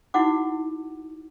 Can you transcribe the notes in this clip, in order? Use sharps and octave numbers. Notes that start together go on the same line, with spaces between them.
D#4 E4 F#4 F#5 D6